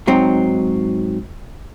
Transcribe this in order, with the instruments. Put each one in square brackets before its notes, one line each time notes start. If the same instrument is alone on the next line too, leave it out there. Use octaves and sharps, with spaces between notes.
[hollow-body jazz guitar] G#2 F#3 C4 D#4